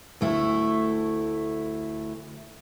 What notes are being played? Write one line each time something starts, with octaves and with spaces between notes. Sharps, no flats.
D2 A3 E4